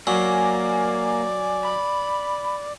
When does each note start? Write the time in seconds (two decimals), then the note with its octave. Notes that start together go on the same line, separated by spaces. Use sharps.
0.07 F#3 A#3 D5 G#5
1.65 B5